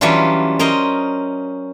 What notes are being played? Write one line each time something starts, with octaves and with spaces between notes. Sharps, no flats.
E3 F#3 G3 C#4 D4 F4
C#4 A#4 C5 D#5